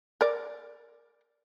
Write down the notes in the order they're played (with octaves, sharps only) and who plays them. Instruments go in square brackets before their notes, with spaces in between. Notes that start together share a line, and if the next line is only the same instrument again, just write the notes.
[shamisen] A#4 D5